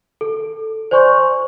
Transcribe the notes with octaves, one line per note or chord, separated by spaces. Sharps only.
A4
C5 D5 G#5 C6 C#6 G6